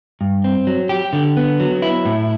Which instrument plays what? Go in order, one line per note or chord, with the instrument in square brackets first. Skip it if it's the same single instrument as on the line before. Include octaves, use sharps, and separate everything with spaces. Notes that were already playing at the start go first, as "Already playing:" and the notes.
[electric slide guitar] G2
C4
F#3
G4
D3
B3
F#3
E4
A2